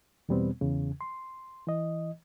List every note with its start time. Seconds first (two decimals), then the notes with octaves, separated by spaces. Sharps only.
0.29 E2 B2 G3 B3 C4
0.61 E2 C#3
1.01 C6
1.67 E3 D#5